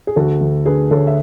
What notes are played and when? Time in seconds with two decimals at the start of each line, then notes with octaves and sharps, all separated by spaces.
0.07 G#4
0.16 D2 F#4 A4
0.41 D2
0.66 D3 G#4 B4
0.91 D2 A4 C#5
1.07 E5